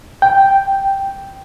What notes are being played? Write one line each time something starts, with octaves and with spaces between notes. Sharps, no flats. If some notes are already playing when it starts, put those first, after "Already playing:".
G5